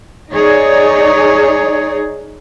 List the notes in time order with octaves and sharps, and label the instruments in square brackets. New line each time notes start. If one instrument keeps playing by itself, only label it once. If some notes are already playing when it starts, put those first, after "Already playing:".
[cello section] D#4 G#4 C#5 D5